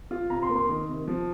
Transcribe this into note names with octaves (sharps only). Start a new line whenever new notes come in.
F4
C3 A#5
C6
A#3
C6
D#3
C3
F3